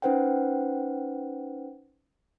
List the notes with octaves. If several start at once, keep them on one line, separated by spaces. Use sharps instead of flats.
C#4 D#4 B4 C5 F#5 G5